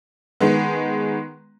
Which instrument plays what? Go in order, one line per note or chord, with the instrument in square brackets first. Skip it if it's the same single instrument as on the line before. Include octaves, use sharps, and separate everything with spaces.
[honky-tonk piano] D#3 G#3 B3